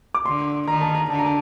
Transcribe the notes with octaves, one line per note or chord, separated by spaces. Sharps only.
D6
D3 C6
D#3 A#5
A5
A#5
D3 A5
A#5
A5